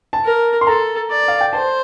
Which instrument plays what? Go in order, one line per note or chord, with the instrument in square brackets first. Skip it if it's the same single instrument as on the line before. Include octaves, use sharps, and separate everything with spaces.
[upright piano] A5
[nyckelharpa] A#4
[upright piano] C6
[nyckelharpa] A4 [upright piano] A#5
[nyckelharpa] D5
[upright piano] F5
G5
[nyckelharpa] C5 [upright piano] A5